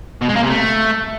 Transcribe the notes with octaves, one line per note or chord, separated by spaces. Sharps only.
B2
G#3
A#3
C3
A3